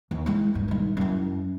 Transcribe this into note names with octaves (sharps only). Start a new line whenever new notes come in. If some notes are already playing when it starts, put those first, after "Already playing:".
D#2
G#3 E4
A1 G2
G2 D#3
F#2 E4